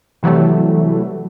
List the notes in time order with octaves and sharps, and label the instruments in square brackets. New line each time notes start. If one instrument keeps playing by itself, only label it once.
[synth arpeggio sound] C3 E3 F#3 G3 A3